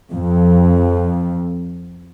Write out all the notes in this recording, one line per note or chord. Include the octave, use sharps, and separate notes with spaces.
F2